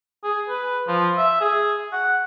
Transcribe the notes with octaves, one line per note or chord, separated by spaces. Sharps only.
G#4
B4
F3
E5
G#4
F#5